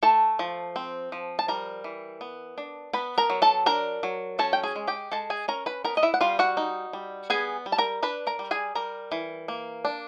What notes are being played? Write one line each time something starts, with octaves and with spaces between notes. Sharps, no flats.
A3 A4 A5
F3
C4
F3
A5
G3 A#4 A#5
E3
B3
D4
B3 B4 B5
A#4 A#5
F#3
A4 A5
D4 A#4 A#5
F#3
C#4 A4 A5
G5
G#4 G#5
G#3
G4 G5
G#3 A4 A5
G#4 G#5
C#4 A#4 A#5
B4 B5
B3 A#4 A#5
D#5
E4 E5
F#5
G3 F4 F5
F#4 F#5
D#4
G3
B3 G#4 G#5
G3
A5
A#4 A#5
D4 B4 B5
A#4 A#5
G3
G#4 G#5
G3 A#4 A#5
E3
A#3
D4